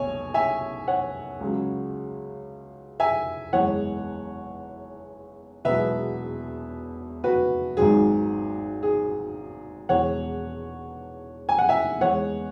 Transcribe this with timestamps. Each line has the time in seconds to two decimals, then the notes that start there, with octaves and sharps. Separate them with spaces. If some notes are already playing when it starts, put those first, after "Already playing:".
Already playing: B1 B2 C#5 G#5
0.34 E5 G#5
0.88 C#5 F#5
1.41 C#2 C#3 F#3
3.00 E5 G#5
3.53 F#1 E2 E3 G#3 C#5 F#5
5.65 E1 E2 B2 F#3 B4 E5
7.24 F#4 B4
7.77 G#1 G#2 F#3 G#4
8.83 G#4
9.89 E1 E2 E3 C#5 F#5
11.49 G#5
11.59 F#5
11.69 E5 G#5
12.01 E2 E3 G#3 C#5 F#5